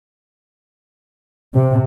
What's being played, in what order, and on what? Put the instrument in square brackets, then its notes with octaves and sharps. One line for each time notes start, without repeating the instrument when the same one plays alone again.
[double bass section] C3